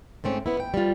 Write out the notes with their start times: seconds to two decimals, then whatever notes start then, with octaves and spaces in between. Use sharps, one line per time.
0.24 G#2 A3 C4 C#4
0.46 B3 E4
0.60 G5
0.74 G3 F4